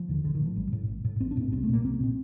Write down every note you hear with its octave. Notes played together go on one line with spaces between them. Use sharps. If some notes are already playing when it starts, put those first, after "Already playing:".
Already playing: F3
D#2 D3
A1 D3
D#3
A2
F3
A1 G3
A2
A1
A2
A1 C4
D4
A2 C4
C2 C4
A3
A#2 A#3
C2 C4
A#3
A#2 C4